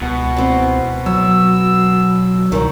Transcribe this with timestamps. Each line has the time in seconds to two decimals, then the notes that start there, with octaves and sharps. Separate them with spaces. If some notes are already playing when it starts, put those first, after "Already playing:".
0.02 C#2 B2 F#5
0.37 E3 C4
1.06 F#3 F#4 E6
2.52 C2 D#3 E3 F#3